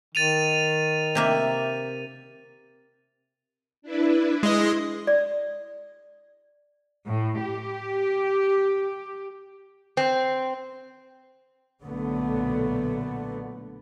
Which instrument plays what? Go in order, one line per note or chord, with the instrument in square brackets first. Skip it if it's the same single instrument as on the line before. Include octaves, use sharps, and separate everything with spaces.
[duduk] D#3 [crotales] A6 D#7 F7
[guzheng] C3 A#3 E5
[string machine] D4 E4 B4
[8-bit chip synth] G#3 D#5 [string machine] E4 C6
[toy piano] D5
[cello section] A2
G4
[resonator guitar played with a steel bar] C4
[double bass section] B1 A#2 D3 A3 B3